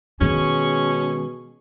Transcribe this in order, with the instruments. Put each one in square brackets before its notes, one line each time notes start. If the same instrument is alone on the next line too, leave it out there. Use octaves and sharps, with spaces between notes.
[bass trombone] B2 [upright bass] D#3 G#3 [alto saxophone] C#4 [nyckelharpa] G#4 C#6